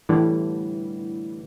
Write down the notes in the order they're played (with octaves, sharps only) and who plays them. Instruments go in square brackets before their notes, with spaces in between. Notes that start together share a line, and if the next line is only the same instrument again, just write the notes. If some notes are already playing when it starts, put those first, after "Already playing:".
[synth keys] A2 D3 E3 G3